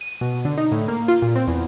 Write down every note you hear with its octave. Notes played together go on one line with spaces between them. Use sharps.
D#7
B2
D3
D#4
A2
A#3
F4
A#2
C4
E2